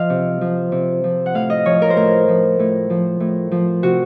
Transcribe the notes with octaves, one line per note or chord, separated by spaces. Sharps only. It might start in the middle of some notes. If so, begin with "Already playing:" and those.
Already playing: F3 D#5 F5
C3
F3
C3
F3
F#5
A2 F5
D#5
F3 C#5
A#4
C5
A2 A#4
F3
A2
F3
A2
F3
C3 F#4